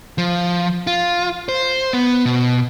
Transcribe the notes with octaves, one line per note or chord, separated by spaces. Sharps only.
F3
F4
C5
B3
B2